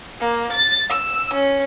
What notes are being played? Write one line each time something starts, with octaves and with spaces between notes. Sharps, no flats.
A#3
A6
E6
C#4